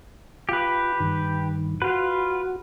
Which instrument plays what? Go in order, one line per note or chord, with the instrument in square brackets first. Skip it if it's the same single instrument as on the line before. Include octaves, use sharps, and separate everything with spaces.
[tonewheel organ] F4 [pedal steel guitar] G4 B4
[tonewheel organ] G2 D#3
[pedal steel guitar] F4 B4 [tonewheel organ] F#4